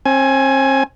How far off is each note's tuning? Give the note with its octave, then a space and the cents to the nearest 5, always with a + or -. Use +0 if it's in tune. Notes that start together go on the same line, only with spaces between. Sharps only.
C4 +40 G#5 +15